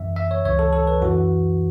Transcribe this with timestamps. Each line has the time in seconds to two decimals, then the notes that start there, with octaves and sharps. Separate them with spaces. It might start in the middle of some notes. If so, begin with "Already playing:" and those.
Already playing: F#2 E3 E5
0.16 E5
0.31 C#5
0.44 C#2 C#3 E3 C#5
0.59 A4
0.73 A4
0.87 B4
1.02 F#2 E3 F#4